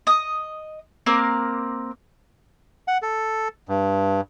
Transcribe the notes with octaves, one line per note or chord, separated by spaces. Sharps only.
D#5 D#6
A#3 C4 A#4 D6
F#5
A4
G2